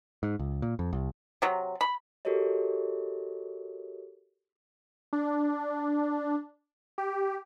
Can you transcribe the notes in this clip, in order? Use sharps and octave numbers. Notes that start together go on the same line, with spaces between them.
G#2
C#2
A#2
F2
C2
C3 F#3
B5
F#4 G4 A4 A#4 C#5 D#5
D4
G4